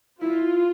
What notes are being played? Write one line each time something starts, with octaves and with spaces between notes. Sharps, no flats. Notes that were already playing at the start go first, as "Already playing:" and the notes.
E4 F4